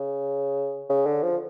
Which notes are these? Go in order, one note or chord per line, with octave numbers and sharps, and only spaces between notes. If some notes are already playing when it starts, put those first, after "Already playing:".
Already playing: C#3
C#3
D3
F3